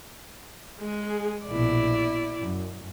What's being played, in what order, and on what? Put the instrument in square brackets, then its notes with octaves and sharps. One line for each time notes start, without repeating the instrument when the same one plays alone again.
[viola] G#3 G#4
[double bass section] A#1 B2 [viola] E4 D5
[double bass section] F#2